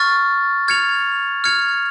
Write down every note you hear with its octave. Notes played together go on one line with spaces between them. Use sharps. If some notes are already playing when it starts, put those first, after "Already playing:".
Already playing: C#6 F6 A6
F6 G#6 C#7 F7
F6 G#6 C#7 F7